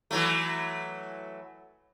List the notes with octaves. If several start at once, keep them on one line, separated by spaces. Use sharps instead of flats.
E3 F#3 A3